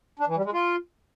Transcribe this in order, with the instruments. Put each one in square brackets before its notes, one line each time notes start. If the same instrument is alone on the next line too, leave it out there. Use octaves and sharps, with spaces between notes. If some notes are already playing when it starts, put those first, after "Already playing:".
[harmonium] D4
E3
G3
G#3
F4